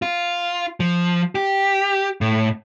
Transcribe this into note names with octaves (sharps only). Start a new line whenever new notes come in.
F4
F3
G4
A2